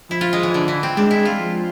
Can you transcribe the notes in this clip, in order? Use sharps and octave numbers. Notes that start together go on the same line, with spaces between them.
F3 E4
F4
G#3
E3
D3
E3
C4
G#3 D4
E4
F4
F3